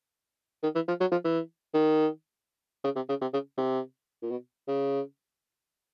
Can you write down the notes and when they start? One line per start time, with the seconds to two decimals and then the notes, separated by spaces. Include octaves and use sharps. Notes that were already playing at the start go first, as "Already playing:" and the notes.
0.63 D#3
0.75 E3
0.88 F3
1.00 F#3
1.12 F3
1.24 E3
1.74 D#3
2.84 C#3
2.96 C3
3.09 C#3
3.21 C3
3.33 C#3
3.57 C3
4.23 A#2
4.31 B2
4.68 C#3